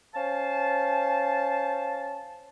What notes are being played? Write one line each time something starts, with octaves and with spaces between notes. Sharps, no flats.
C#4 C5 F5 A5